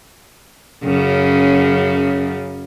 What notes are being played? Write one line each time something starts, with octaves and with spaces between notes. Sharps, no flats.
F#2 C#3